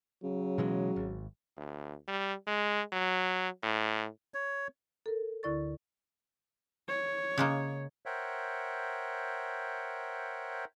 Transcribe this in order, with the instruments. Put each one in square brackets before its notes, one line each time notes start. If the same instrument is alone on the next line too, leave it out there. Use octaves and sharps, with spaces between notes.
[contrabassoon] C#3 [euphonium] F#3
[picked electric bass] B2 E3 G#3
G#1
[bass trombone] D2
G3
G#3
F#3
A2
[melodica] C#5
[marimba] A4 A#4
D2 D3 E4 D5 C#6 A6
[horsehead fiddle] C#5
[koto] C#3 G#3 A#3
[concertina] A#4 C5 C#5 E5 F#5 G5